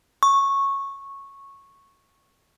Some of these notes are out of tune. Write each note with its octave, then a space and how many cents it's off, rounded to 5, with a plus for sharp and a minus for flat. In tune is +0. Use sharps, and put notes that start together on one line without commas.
C#6 -10